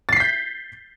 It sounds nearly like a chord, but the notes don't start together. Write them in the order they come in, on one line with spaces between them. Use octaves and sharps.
A6 C7 B6 G6